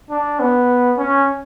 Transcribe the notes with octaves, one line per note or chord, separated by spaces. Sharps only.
D4
B3
C#4